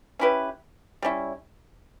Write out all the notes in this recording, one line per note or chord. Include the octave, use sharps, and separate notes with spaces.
C#4 E4 G4 B4
G3 C#4 E4